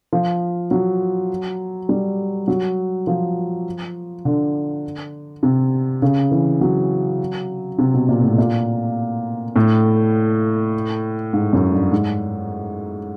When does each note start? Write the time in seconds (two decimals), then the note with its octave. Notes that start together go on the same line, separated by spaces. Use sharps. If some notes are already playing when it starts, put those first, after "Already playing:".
0.13 F3
0.71 F#3
1.89 G3
2.48 F#3
3.07 F3
4.25 D3
5.43 C3
6.02 C#3
6.31 E3
6.61 F#3
7.78 C3
7.94 B2
8.09 A#2
8.23 A2
8.38 A#2
9.56 A2
11.33 G#2
11.53 F#2
11.72 G2
11.92 G#2